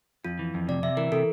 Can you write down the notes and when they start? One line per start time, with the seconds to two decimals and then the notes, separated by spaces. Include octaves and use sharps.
0.25 F2 F4
0.39 E3
0.54 F2
0.68 C3 D5
0.83 C3 E5
0.97 E3 A#4
1.12 C3 A4